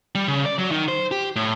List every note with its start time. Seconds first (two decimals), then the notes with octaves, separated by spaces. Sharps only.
0.15 G3
0.28 C#3
0.45 D5
0.59 F#3
0.71 D#3
0.88 C5
1.11 G4
1.36 A2